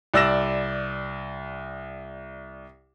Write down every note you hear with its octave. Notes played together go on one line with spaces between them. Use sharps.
C2 D5 E6 A#6 E7